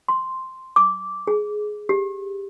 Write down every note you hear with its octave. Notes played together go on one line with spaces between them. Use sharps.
C6
D6
G#4
G4